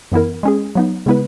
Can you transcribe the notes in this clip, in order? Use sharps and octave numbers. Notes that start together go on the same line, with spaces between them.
F#2 E3 B3 E4 A#4
G#3 C#4 G#4
F#3 B3 D#4
C#3 G#3 B3 E4 B4